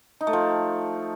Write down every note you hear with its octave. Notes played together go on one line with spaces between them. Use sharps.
D#4
A3
F3